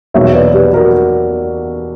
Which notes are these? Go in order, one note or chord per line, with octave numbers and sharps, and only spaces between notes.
E2 B2 F#3 A#3 C#5 E5
B4 D5
G4 B4
F#4 A#4